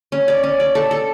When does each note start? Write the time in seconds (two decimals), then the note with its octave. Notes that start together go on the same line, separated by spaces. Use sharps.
0.12 C#4
0.28 D5
0.43 C#4
0.60 D5
0.75 A4
0.91 A4